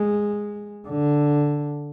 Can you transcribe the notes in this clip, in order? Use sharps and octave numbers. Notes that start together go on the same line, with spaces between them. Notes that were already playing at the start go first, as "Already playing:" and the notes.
Already playing: G#3
D3